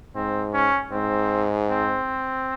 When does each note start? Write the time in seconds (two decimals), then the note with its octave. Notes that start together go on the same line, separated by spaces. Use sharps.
0.15 G#2 C4
0.53 C#4
0.92 G#2 C4
1.70 C4